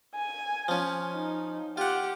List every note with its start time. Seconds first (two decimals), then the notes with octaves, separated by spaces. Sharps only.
0.15 G#5
0.68 F3 C#4
1.14 D#4
1.77 F4 G4 F#5